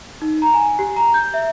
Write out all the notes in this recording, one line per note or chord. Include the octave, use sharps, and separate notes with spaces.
D#4
A#5
G#5
G4
A#5
G6
E5